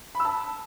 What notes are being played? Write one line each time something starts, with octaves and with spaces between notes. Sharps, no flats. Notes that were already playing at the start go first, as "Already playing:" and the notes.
B5
E6
A5